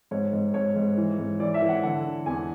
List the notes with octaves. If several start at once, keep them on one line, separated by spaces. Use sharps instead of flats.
G#2 C#5
G#2
G#2 C#5
G#2
E3
G#2
E3 D5
E5
E3
F#5
D3 F#5
D3
E2 G#5